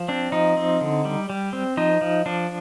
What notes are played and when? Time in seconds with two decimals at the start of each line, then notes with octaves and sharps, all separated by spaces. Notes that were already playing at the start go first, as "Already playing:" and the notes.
Already playing: F3
0.08 C4 D4
0.32 F3 D#4
0.57 C4
0.81 D3
1.05 G3
1.30 G3
1.53 C4
1.77 F3 D#4
2.01 F3
2.26 F3 D4